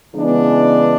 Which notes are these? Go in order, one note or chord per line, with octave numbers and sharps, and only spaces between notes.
C#3 E3 G#3 B3 D4